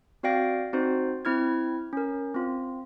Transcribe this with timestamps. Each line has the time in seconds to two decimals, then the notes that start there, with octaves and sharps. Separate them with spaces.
0.23 C4 F#4 D5 F5 G5 A#6
0.73 C4 D#4 F#4 C5
1.25 C4 E4 F6 G#6
1.93 C#4 A#4
2.34 C4 F4